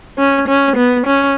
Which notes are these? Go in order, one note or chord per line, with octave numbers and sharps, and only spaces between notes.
C#4
C#4
B3
C#4